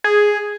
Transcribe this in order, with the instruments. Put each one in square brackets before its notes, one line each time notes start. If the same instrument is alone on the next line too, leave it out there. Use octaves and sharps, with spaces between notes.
[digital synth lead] G#4